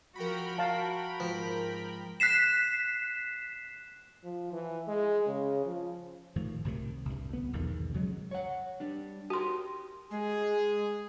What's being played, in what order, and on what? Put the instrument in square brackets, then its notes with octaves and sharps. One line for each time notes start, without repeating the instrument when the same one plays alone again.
[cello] F3 F#4 [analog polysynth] A#4 G5 B5
[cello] F#4 [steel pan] F5 A5
[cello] G#2 [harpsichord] F3
[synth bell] F#6 B6 C7 E7
[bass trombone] F3
E3
G#3
C#3
F3
[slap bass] A2 D#3 F3
C2 A2 C3 D#3
C2 G2
D2 B3
B1 E2 G#2 D#3
C#3 F#3 G#3
[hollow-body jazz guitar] C#5 F#5
G3 D4
[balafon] F#4 C6 [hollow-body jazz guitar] G4 A#4
[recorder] G#3 [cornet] G#4